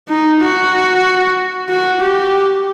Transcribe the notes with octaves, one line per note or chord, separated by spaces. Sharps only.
D#4
F#4
F#4
G4